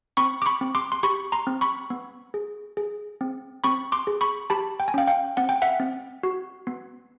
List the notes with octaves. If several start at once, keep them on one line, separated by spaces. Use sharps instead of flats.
C4 B5 C#6
D6
B5 C#6
C4
C6 D6
C6
G4 B5 C#6
A#5 C6
C4
B5 C#6
B3
G#4
G#4
C4
C4 B5 C#6
C6 D6
G#4
B5 C#6
G4 A5 B5
G5
G#5
C#4 F5 G5
F5 G5
C4 F#5
G5
E5 F#5
C4
F#4
B3